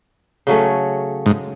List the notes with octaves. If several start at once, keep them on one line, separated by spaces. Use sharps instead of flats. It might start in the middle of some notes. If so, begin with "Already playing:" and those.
C#3 F#3 A3 C#4
G#2